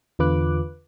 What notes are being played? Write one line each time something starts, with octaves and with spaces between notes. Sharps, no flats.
E2 D3 F4 B4 D6 F#6